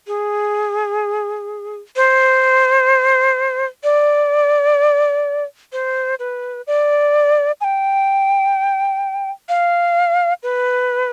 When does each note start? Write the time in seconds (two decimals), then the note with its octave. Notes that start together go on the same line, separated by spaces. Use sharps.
0.07 G#4
1.96 C5
3.84 D5
5.73 C5
6.19 B4
6.67 D5
7.61 G#5
7.64 G5
9.49 F5
10.43 B4